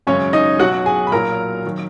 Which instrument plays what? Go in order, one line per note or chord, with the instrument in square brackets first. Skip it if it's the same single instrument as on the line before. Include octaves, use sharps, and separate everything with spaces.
[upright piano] G#1 F#2 C#3 G#3 C#4 C#5
D#4 D#5
B1 B2 F#3 F#4 F#5
G#4 G#5
B5
B1 A#2 F#3 A#4 A#5
D#3 F#3